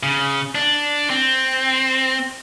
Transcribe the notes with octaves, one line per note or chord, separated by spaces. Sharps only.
C#3
D4
C4